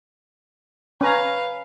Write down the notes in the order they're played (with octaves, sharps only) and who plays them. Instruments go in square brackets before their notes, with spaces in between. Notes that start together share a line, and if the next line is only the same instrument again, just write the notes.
[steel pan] C#4 A#5 [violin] B4 F5